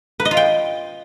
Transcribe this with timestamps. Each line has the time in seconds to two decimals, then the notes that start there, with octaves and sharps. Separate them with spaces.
0.20 B4
0.25 D#5
0.31 F4
0.37 G5